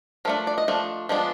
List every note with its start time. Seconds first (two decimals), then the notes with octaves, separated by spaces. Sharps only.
0.25 F3 A3 D4 A#4
0.47 D5
0.58 D#5
0.68 F3 A3 D4
1.09 F3 G#3 B3 D4